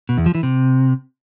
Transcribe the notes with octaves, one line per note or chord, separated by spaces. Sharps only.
B2
E2
F3
E3
C3